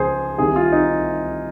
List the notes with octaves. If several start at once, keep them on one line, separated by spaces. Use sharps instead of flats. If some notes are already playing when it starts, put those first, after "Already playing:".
Already playing: C#2 C#3 F3 G#4 C5
C2 C3 D#3 G#4
F4
D#4